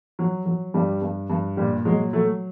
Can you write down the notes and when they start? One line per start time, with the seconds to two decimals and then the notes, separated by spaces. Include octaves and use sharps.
0.19 F#3
0.46 F#3
0.74 G2 G3
1.02 G2
1.30 G2
1.57 A#2 G3
1.85 F#3 G#3
2.13 F#3 A3